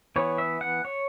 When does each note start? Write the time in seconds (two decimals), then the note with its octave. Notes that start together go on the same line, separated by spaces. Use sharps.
0.16 E3 B3 C#5
0.38 E5
0.61 F#5
0.85 C#5